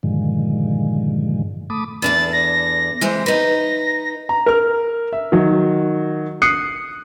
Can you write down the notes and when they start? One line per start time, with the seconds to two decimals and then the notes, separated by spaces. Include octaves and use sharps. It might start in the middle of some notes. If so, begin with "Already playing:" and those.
0.03 G2 A#2 D3 D#3 F3 G#3
1.70 A3 A5 B5 D6 D#6
2.02 E2 D4 A4 A6
2.33 A#6
3.01 E3 G#3 C4
3.26 D#4 B4 A#6
4.29 A#5
4.46 A#4 F6
5.13 E5
5.32 D#3 F#3
6.42 D#6 F#6 C7 C#7